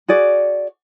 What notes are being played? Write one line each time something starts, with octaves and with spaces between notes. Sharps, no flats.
F#4 G#4 D5